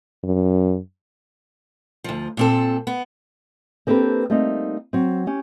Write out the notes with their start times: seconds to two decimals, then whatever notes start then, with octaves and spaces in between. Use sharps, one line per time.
0.24 F#2
2.04 D2 F3
2.37 A#2 C4 A4
2.87 B3
3.87 A#3 C4 D4 G4 A4 B4
4.30 G3 A3 A#3 C4 D#4
4.93 F#3 C4
5.27 C#4 G4